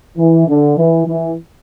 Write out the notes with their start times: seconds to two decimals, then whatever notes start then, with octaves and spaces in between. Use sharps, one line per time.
0.17 E3
0.47 D3
0.77 E3
1.06 E3